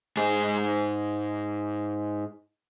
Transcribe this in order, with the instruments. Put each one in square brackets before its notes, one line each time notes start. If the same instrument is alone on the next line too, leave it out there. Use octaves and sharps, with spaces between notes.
[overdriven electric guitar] G#2 G#4